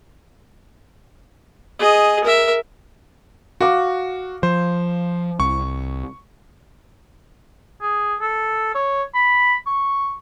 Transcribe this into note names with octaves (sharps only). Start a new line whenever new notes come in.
G#4 D#5
A#4 E5
F#4 F5 D6
F3 C5
C2 C#6
G#4
A4
C#5
B5
C#6